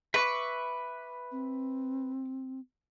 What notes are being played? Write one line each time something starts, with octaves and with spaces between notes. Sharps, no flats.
B4 E5 C#6 D6
C4